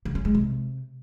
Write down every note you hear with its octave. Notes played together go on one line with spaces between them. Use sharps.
C#3
C#4
G#3
C3